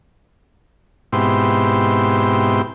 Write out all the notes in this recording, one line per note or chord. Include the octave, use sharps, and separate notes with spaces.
G#2 B2 C4 E4 G4 C6